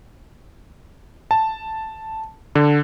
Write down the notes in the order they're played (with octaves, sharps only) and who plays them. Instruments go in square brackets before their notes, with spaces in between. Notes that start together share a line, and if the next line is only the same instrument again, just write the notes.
[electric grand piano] A5
D3